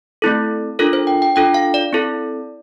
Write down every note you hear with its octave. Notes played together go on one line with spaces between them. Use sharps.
A3 C4 E4 A4
D4 F4 A4 A#4
C5
G5
G5
D4 F4 A4 G5
F5
D5
C4 E4 A4